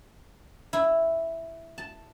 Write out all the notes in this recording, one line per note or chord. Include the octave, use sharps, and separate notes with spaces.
E4
A5